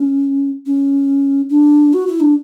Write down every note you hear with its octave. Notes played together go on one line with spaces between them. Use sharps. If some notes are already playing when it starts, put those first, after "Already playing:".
Already playing: C#4
C#4
D4
F#4
E4
D4